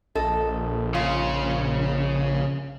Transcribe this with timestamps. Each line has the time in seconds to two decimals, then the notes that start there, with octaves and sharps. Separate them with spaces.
0.15 A#1 A4 D#5
0.94 G#2 C#3 F4